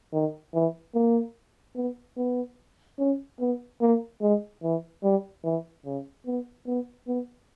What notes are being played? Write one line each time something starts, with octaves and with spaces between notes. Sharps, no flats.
D#3
E3
A#3
B3
B3
C#4
B3
A#3
G#3
E3
G3
E3
C#3
B3
B3
B3